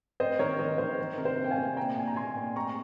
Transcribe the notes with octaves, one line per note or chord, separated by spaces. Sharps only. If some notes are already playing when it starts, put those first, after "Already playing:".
C4 C5 D#5
D#3 A#4 C#5
D#3 C5 D#5
D#3 C5
D#3
C3 A#4
C5
C3
G5
F5 G#5
C3
A#2 G5 A#5
A#2 G#5
A#5
A#2 G#5 C6
A#2
C4 A#5 C#6